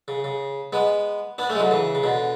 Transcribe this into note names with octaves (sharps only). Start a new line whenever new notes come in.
C#3
C#3
G#3 B3
B3 D4
A3 C#4
G#3
D3 F#3
C#3 E3
C#3
B2 D3